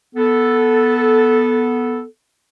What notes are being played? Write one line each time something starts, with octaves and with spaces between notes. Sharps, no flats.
B3 A4